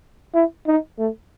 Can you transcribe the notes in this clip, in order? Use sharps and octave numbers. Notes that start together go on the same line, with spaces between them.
E4
D#4
A3